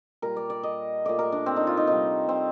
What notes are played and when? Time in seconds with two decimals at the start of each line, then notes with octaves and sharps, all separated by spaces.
0.22 A#2 G3 A#4
0.36 D5
0.50 D5
0.63 D#5
1.05 A#2 A3 D5
1.19 A#4
1.32 D4
1.46 C4
1.56 D#4
1.67 F4
1.77 D#4
1.87 C3 G3 D#4
2.29 C4